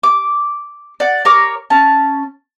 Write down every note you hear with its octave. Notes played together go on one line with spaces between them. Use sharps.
D6
D5 F#5
A#4 C#5 D6
C#4 A5